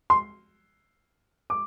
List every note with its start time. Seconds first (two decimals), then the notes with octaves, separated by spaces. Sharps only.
0.10 C6
1.50 D6